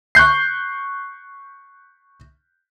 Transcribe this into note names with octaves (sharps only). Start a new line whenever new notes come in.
C#6 F#6 G6 C7